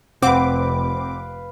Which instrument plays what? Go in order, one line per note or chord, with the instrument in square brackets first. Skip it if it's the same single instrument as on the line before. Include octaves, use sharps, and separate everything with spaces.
[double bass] F1 [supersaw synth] C4 D6 [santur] B4 F5 [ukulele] F#5